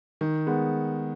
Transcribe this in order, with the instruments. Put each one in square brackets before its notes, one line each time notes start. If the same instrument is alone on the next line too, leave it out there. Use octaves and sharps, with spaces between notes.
[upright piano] D#3
G#3 B3